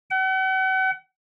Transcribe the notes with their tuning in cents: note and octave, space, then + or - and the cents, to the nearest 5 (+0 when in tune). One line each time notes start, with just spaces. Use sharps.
F#5 +40